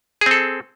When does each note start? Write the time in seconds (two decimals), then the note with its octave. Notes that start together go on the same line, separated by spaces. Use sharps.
0.21 G#4
0.26 C4
0.31 A4